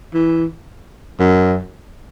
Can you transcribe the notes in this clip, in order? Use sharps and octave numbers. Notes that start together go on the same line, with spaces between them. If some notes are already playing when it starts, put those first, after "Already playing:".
E3
F#2